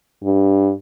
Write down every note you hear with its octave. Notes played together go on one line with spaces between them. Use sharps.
G2